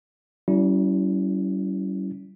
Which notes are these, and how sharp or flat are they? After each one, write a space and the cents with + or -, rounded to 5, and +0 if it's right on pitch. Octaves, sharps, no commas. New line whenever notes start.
G3 -40 C#4 +20 E4 +0